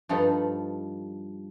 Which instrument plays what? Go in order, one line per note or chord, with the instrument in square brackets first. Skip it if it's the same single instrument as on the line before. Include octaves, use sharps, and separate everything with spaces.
[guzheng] G2 F3 D#4 A4 B5